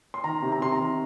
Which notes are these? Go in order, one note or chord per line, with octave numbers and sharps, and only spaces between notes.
C6
D#3 A#5
C3
A#5
C3 C6
A#5
D#3